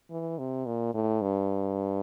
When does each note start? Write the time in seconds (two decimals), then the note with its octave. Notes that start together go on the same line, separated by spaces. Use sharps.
0.11 E3
0.38 C3
0.66 A#2
0.94 A2
1.22 G2